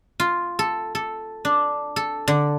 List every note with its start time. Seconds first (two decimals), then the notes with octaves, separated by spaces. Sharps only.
0.20 F4
0.59 A4
0.95 A4
1.45 D4
1.96 A4
2.28 D3